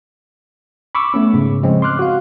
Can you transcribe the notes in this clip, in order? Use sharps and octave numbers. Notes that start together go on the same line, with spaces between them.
B5 C#6 D6 E6
A3 B3 C#4
G#2 C#3
C#3 F3 G#3 C4 C#4
C6 D6 F6 F#6
F#4 F5